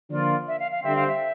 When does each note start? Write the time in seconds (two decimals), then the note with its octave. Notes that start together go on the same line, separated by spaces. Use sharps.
0.10 D3 F3 A#3 F4 D5
0.48 E5
0.60 F5
0.72 F5
0.84 D3 G3 C4 E5
0.96 F5
1.07 E5